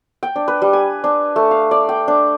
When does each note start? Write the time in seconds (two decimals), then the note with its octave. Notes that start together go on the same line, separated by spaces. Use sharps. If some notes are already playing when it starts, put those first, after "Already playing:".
0.23 G5
0.36 D4
0.48 B4
0.62 G3
0.73 G#5
1.04 D4
1.36 A3
1.51 F5
1.71 D5
1.89 G5
2.08 D4